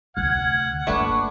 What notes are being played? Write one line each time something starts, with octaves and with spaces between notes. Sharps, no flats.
F1 D2 F#5 F6 G#6
G1 A3 A#3 D4 B4 C#6 D6